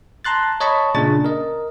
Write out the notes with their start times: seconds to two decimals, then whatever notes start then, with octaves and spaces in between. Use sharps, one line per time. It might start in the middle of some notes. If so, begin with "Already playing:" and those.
0.25 A5 A#5 C6 F#6 A6
0.60 C#5 D#5 A5 B5 C#6
0.95 A#2 C#3 D4 A6
1.25 A#4 D#5